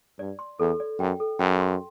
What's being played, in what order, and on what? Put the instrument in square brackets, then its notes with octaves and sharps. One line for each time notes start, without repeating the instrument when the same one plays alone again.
[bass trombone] G2 [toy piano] D5
[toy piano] C6
[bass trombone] E2 [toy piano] A4
[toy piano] D5
[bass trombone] F#2 [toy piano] G5
[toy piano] A4
[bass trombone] F#2 [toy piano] G5
[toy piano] C6